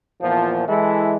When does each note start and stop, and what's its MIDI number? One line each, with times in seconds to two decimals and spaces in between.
0.22 0.67 40
0.22 0.67 46
0.22 0.67 53
0.68 1.16 52
0.68 1.16 56
0.68 1.16 64
0.68 1.16 69